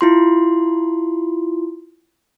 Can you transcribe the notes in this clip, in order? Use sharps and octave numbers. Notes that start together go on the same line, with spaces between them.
E4 F4 C6